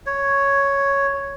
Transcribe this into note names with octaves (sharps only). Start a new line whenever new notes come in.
C#5